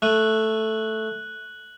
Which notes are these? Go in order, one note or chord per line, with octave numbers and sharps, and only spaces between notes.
A3 F#6 D#7 F#7